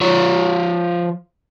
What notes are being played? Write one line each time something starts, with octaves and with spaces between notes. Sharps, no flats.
F3 C#5